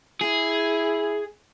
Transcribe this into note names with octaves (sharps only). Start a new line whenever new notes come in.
E4 G#4